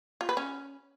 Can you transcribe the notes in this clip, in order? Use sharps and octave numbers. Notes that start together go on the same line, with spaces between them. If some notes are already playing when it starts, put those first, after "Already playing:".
F4
B4
C#4